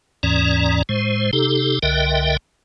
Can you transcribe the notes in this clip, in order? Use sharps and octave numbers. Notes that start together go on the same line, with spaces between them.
D#2 G#2 E3 C#4 D5 A#5
A2 G#3 C5
C3 D#4 G4 A4
C2 D3 A#4 D#5 E5 G5